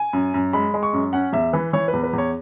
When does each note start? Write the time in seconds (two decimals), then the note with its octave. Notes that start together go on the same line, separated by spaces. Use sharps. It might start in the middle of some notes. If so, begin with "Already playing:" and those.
Already playing: G#5
0.13 F#2
0.34 F#2
0.53 G#3 B5
0.74 G#3
0.83 C#6
0.93 F#2
1.13 C#4 F#5
1.33 E2 E5
1.53 E3 B4
1.73 E3 C#5
1.88 B4
1.93 E2
2.03 B4
2.13 E2
2.18 C#5